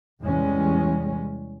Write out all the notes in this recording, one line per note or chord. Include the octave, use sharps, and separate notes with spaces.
E2 C3 E3 G3 G#3 C#4